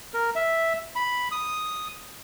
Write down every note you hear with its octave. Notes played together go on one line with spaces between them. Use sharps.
A#4
E5
B5
D#6